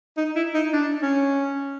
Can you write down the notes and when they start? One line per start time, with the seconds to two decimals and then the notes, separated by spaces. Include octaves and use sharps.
0.17 D#4
0.36 E4
0.54 D#4
0.73 D4
1.03 C#4